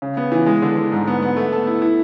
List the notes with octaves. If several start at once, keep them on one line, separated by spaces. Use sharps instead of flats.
C#3
B3
E3
G#3
D3
D3
G#2
B3
B3
A3
A4
E4
E4